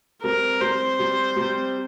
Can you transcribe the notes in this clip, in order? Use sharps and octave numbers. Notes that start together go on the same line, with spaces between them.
C3 G3 C4 A#4
C3 G3 C4 C5
C3 G3 C4
C3 G3 C4